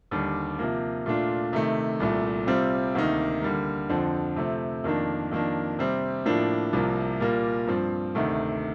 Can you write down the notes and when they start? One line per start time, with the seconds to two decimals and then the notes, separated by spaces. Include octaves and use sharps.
0.11 D#2 D3 G3
0.59 C3 F3 A#3
1.06 A#2 A3 D4 F4
1.53 C3 D#3 A3
2.00 C2 A#2 A3
2.47 C3 G3 C4 F4
2.95 D2 C3 D#3 A#3 D#4
3.42 D3 G3 A#3
3.89 F2 D3 F3 C4
4.36 C3 F3 A3 C4
4.84 F2 D#3 A#3 D4
5.31 F2 D#3 A#3 D4
5.79 C3 G3 C4
6.25 A2 F3 A#3 D4
6.73 C2 C3 F3 A#3
7.20 A#2 G3 A#3
7.67 G2 F3 C4
8.15 D2 C3 D#3 A3